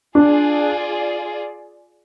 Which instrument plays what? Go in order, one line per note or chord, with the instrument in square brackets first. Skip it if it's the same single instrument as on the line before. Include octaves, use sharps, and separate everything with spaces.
[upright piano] D4 [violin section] F4 G#4 D5